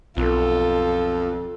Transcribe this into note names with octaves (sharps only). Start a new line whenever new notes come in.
B1 F2 F4 A4